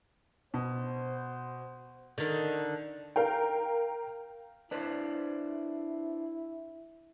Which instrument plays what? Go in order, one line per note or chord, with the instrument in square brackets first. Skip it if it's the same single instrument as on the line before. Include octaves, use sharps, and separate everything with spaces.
[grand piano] B2 [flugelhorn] C5
[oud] D3 D#3
[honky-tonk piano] A#4 F5 G5
[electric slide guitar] D4 B4 C5 [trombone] E4